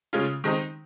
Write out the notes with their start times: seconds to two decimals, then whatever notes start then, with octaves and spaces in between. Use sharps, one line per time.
0.13 C#3 G#3 C#4 F4
0.44 D#3 G#3 C4 D#4